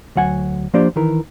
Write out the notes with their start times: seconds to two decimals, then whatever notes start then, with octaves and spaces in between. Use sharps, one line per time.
0.16 D2 F#3 F#5 G#5
0.74 F3 A#3 D4 G4 C5 D5
0.96 D#3 E3 A#4